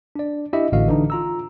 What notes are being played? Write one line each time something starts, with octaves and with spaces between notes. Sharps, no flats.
D4 D5
D4 E4 G4 D#5 E5
A1 A2 D3 F#4 D#5 F5
D3 E3 D4 D#4
F4 A#5 E6